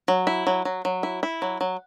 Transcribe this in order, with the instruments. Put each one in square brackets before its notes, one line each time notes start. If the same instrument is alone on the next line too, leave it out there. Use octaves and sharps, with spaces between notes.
[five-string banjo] F#3
E4
F#3
F#3
F#3
E4
E4
F#3
F#3